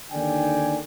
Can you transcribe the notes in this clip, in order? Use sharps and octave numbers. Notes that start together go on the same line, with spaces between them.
D#2 D3 D#3 D5 G5 G#5